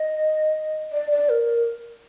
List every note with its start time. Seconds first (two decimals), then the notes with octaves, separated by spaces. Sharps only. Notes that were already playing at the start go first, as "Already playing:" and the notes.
Already playing: D#5
0.93 D5
1.11 D5
1.29 A#4